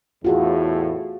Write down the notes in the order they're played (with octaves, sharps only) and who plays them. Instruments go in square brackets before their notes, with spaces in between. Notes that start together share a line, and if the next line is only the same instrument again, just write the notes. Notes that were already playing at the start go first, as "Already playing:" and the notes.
[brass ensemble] E2 A2 [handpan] F4 F#4 G#4